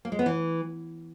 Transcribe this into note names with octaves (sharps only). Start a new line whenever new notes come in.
A#3
G#3
B3
E3